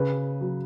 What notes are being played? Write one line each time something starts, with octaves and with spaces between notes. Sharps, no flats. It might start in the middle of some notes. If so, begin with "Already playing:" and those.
Already playing: C#3 B4
F#3